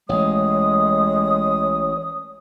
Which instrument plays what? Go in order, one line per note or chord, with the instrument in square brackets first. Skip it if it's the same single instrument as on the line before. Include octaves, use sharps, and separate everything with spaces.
[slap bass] A1 [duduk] G#3 [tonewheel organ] C#5 [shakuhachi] D#6